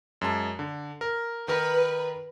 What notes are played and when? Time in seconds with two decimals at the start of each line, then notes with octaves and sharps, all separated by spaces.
0.21 F#2 G#3 A5
0.59 D3
1.01 A#4
1.48 D#3 A#4 B4